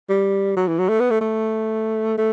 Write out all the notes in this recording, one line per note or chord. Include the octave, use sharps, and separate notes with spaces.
G3
F#3
E3
F#3
A3
B3
A3
A3
A3